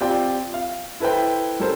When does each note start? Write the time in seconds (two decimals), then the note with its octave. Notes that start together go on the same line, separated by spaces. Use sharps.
0.01 C4 F4 G4 D5 G5
0.54 F5
1.00 E4 A4 B4 C5 G5
1.60 G3 C#4 A4 A#4 C5